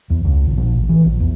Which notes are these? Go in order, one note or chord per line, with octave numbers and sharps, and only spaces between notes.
E2
C#2
G#1
A#1
A1
E3
A#1
E2